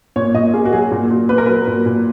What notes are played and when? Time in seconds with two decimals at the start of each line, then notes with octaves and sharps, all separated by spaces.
0.16 A#2 C#5
0.34 A#2 D#5
0.53 A#3 G#4
0.65 F#4
0.72 F#3 G#4
0.91 A#2
1.10 A#2
1.29 A#3 B4
1.38 A#4
1.46 F#3 B4
1.67 A#2
1.86 A#2